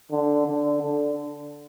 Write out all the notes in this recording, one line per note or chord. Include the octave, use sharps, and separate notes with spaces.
D3
D3
D3